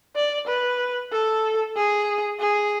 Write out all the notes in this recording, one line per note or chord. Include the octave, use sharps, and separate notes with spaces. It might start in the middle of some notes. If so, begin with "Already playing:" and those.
D5
B4
A4
G#4
G#4